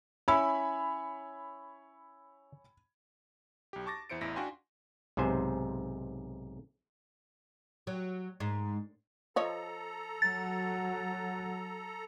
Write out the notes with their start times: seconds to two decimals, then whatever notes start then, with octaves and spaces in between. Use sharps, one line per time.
0.28 C#4 E4 C#5 G#5 B5 E6
3.73 B1 G4
3.86 A5 C#6 D6 A6 A#6
4.10 E2 E4 C5 C#7 D7
4.21 A1 E2 E4 A#6 B6
4.36 D4 F#4 F5 G5 G#5 C6
5.17 B1 G#2 C3 C5 G#5
7.87 F#3
8.40 G#2
9.36 F3 A4 C#5 D#5 A#5
10.22 F#3 A6